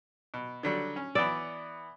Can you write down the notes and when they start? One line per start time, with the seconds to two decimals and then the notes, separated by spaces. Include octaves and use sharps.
0.34 B2
0.63 D3 F#3 G3
0.96 C#4
1.15 E3 B3 D5 E6